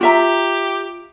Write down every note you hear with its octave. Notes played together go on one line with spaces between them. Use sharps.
F4 G4 E5 A#5